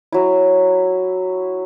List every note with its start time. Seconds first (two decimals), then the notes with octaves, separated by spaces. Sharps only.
0.12 F#3 E4